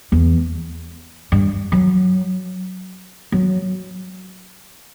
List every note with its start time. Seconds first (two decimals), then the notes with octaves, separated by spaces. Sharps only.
0.12 E2
1.32 G2
1.72 F#3
3.32 F#3